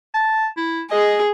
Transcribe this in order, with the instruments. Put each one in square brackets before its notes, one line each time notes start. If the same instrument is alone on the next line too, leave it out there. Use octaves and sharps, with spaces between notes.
[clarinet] A5
E4
[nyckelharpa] G#4 [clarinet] D#5